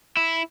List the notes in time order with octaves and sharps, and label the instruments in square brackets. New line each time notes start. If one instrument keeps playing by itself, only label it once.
[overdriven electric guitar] E4